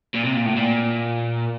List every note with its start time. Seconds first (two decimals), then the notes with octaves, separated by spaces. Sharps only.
0.14 A#2
0.24 C3
0.35 A#2
0.45 A2
0.56 A#2